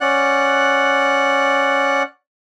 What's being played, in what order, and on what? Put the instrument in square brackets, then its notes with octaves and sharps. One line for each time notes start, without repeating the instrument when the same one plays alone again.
[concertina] C#4 D5 F#5 F#6